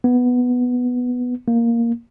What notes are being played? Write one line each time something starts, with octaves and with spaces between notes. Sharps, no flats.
B3
A#3